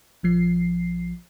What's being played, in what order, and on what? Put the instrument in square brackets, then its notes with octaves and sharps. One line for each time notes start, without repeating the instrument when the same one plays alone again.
[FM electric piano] A#1 F3 C7